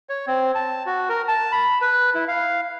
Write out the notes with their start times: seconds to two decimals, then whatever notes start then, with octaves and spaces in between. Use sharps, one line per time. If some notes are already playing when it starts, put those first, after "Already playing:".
0.09 C#5
0.27 C4
0.55 A5
0.86 F#4
1.09 A#4
1.28 A5
1.52 B5
1.81 B4
2.14 E4
2.28 F5